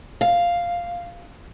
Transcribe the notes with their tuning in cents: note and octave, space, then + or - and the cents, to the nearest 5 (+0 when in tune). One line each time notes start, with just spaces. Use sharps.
F5 +0